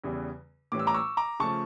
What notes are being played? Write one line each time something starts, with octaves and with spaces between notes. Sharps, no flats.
E2 C#3 E3 G3
A2 E3 G3 C#4 D6
E6
A#5 D6
C#6 E6
A#5 D6
C#3 F3 A3 A5 C#6